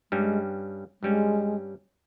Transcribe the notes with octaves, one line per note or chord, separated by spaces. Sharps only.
G2 G3 G#3 C#4
G2 G3 G#3 C#4